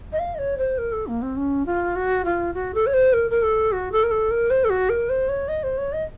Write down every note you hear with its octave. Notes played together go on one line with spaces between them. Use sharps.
D#5
F5
D#5
C#5
C5
A#4
A4
A#3
C4
C#4
F4
F#4
F4
F#4
A4
C#5
C5
A#4
A#4
A4
F#4
A4
A#4
A4
A#4
C5
A4
F#4
A#4
C5
C#5
D#5
C5
C#5
D#5